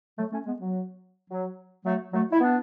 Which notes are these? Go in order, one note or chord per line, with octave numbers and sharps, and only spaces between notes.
F#3 A3
A3 C#4
G#3 B3
F#3
F#3
F#3 A3
F#3 A3
E4
B3 D4